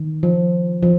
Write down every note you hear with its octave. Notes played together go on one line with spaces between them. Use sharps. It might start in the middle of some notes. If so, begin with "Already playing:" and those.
Already playing: D#3
F3
F3